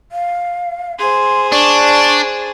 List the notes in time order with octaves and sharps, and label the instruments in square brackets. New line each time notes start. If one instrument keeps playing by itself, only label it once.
[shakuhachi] F5
[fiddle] G#4 C5 [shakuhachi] C6
[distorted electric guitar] D4 [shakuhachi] C#6